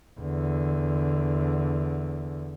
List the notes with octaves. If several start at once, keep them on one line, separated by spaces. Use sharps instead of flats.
E2 D3